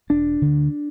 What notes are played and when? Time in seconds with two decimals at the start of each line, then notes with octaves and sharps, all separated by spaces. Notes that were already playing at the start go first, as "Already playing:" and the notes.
0.10 E1 D4
0.42 D2 D3